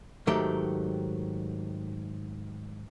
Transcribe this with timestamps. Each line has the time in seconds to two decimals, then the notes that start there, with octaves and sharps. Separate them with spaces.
0.27 G#2 D#3 F#3 A3 G4